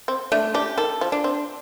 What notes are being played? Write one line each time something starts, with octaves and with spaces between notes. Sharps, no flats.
C4
A3 D4
D4 G4
D#3 A4
F3
D4
C4